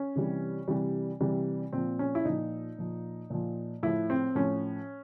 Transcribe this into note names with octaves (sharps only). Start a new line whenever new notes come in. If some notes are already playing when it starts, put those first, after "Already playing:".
Already playing: C#4
C3 E3 G3
C3 E3 G3
C3 E3 G3
A#2 F3 C4
C#4
E4
A#2 F3 D#4
A#2 F3
A#2 F3
A2 F3 E4
C4
A2 F3 C#4